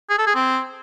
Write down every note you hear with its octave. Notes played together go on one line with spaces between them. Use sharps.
G#4
A4
G#4
C4